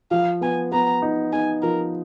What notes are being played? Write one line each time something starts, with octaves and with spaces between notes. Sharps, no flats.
F3 F5
B3 G#5
B3 A#5
D#4
D#4 G#5
F3 A#4